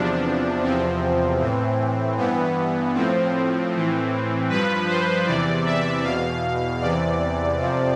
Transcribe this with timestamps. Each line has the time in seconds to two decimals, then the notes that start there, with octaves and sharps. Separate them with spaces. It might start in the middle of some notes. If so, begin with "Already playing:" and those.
Already playing: E2 C3 F3 D4
0.63 E2 C3 F3 C4
1.40 A2 E3
2.17 G2 E3 B3
2.94 A2 F3 C4
3.72 A2 E3
4.49 G2 F3 B4
4.88 C5
5.26 E2 C3 E3 D5
5.66 E5
6.04 E2 B2 F5
6.81 E2 C3 E3 D5
7.58 F2 C3 F3